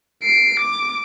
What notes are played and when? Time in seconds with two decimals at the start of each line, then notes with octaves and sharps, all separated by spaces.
0.23 C7 D7
0.60 D6